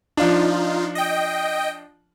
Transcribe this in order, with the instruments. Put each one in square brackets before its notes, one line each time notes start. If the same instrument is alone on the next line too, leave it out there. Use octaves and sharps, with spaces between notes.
[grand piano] F3 D4 [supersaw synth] D#4 F4
[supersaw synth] D#5 G5